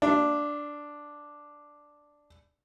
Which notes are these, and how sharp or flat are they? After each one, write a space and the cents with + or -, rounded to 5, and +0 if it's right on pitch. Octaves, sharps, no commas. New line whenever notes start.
D4 +0 E5 +45